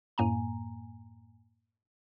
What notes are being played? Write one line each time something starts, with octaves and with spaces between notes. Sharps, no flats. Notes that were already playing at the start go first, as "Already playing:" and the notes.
F#2 A2 A#3 G#5 A#5